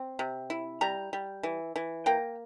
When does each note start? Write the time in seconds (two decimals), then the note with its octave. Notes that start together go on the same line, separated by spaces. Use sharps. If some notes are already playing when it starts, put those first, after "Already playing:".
Already playing: C4
0.19 C3
0.50 E4
0.81 G3 A#5
1.13 G3
1.43 E3
1.76 E3
2.06 A#3 G5